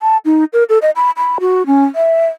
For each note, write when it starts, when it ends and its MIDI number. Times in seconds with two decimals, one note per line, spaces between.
0.01 0.17 81
0.25 0.44 63
0.53 0.64 70
0.69 0.78 69
0.82 0.90 75
0.96 1.11 83
1.17 1.38 83
1.40 1.66 66
1.66 1.84 61
1.95 2.27 76